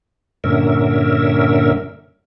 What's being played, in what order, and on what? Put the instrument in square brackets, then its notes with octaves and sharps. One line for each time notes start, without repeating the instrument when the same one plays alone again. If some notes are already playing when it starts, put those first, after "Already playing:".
[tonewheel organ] G2 A#2 D3 C#4 A#4 E5